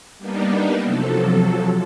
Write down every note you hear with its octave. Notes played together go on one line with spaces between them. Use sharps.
G3 A#3 B3 D4 D#4
C3 F3 F#3 A4